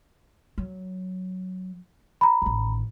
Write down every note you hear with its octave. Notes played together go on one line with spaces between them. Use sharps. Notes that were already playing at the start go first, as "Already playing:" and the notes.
F#3
A#5 B5
A1 D#3